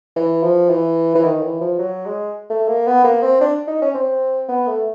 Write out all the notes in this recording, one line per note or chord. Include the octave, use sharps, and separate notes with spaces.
E3
F3
E3
E3
D#3
E3
F3
F#3
G#3
A3
A#3
B3
A#3
C4
D4
D#4
C#4
C4
B3
A3